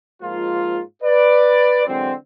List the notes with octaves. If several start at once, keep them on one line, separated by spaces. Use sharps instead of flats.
G#2 F3 G#3 A#3 F4
B4 D5
D3 E3 F#3 G#3 C4